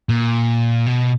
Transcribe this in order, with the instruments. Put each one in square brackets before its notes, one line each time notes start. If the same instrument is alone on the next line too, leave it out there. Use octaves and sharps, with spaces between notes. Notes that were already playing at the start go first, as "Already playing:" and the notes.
[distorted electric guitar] A#2
B2